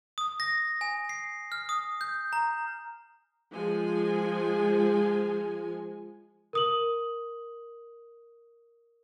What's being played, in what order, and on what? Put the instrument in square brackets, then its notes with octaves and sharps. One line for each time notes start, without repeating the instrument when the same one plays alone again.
[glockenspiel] D#6
A#6
G#5
C7
F6
D#6
G6
A#5
[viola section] F3 G#3 G#5
[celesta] A#4 D#6 F#7